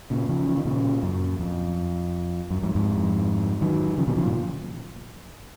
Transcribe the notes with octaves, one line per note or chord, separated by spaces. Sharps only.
A#2 C#3
C#3 F3
F3
D#3
A#2 C#3
F#2
F2
F#2
F2 G#2
F2 G#2
D#3 F#3
C#3 F3
B2 D#3
C#3 F3
F#2 A#2